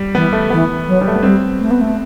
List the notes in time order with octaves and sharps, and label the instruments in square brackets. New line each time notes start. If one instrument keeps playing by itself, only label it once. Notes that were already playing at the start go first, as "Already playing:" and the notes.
Already playing: [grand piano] G3
[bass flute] E3 [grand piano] B3
[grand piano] A3
[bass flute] E3 [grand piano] B3
[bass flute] F#3
[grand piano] G3
A3
B3
[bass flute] G3 [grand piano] C4
[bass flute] A3
B3
A3